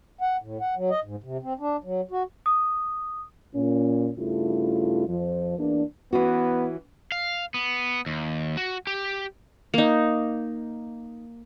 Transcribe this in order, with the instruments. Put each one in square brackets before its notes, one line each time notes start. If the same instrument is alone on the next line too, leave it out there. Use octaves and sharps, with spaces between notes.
[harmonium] F#5
A2
F#5
F#3
D#5
G#2
C3
C4
D4
F#3
F#4
[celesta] D#6
[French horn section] A#2 C#4
G2 C#3 A3 E4 F4
F2 F3
E2 E3 A#3 D4
[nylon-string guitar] E3 C#4 F#4 [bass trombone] B3
[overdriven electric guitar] F5
B3
D#2
F#4
G4
[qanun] A#3 D#4